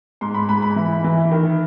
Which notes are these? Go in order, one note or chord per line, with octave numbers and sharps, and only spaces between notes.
G#2 C6
B5
G#2 B5
B5
E3
E3
D#3